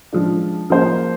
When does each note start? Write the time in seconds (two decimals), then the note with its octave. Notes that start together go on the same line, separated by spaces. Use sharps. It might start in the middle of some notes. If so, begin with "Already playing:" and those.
0.13 F3 G#3 D4
0.70 F3 A#3 F4 G#4 C5